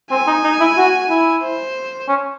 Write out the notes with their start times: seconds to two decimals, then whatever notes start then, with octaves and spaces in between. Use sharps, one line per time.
0.11 C4 G#5
0.27 D#4
0.44 D#4
0.60 E4
0.77 F#4
1.09 E4
1.43 C5
2.08 C#4